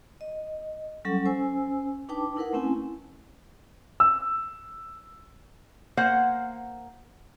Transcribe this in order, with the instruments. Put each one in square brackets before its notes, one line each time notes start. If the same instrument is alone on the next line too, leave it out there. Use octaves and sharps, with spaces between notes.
[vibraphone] D#5
F#3 G3 C#4 A4 F#5 C#6
C#4 C5 G#5 E6
D4 D#4 B4 G5 A5 D6
D#4 E4 A#4 B4 F#5
A3 C4 C#4 E4 G#5
[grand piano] E6
[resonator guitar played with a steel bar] A#3 C5 F#5